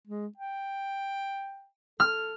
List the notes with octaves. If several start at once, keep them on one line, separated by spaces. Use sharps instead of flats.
G#3
G5
A4 F6